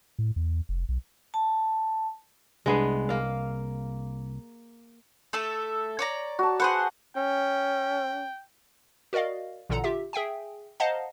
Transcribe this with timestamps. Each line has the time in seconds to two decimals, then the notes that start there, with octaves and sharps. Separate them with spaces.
0.19 A2
0.36 E2
0.69 F1
0.89 B1
1.34 A5
2.66 C2 G#3 B3 D4 G#4
3.09 A#3 F5
5.33 A3 A4 E5
5.99 C#5 D5 A#5
6.39 F#4 A5
6.60 G#4 B4 C5 F#5
7.17 C#4 G5
9.13 F#4 A#4 D5 D#5 F5
9.70 A1 A#2 D3 A4 F#5 A#5
9.84 F4 G4 E5
10.13 G#4 E5 G5 G#5
10.80 C5 D#5 F5 F#5 A5 A#5